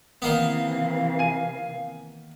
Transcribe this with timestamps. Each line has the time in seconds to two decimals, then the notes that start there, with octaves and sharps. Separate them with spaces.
0.22 C3 D#3 E3 A#3 B3 F5
1.19 G#5 D#7